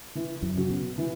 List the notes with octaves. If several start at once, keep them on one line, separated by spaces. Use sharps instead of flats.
E3
F#2
C#3 C#4 F#4
B2
E3